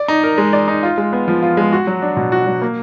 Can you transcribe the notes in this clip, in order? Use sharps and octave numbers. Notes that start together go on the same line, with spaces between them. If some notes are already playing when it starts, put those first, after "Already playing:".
Already playing: D5
D#4
A#4
G#3
D5
D#4
F4
G#3
B3
F3
F4
G#3
F#4
F#3
D4
B2
F#4
F#3
A#3